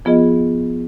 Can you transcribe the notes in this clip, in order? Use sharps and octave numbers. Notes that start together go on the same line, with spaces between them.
F3 B3 F4 G#4 D#5